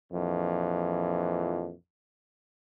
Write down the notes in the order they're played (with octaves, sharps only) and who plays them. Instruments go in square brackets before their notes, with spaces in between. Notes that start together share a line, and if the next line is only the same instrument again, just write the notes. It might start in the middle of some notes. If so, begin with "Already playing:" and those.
[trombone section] A#1 F2 E3